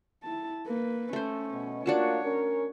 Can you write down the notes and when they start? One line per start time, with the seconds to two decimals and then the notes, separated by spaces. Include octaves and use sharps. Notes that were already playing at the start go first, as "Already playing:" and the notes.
0.24 E4 A5
0.67 A#3 B4
1.13 A3 C#4 C5
1.51 B2
1.86 A#3 D4 F4 F#4 C#5 A5
2.25 C#4 A#4